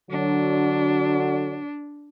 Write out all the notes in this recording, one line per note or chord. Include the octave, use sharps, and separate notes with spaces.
D3 F#3 D4